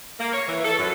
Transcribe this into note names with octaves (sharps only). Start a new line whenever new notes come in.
A#3
C#5
E3
A4
F#2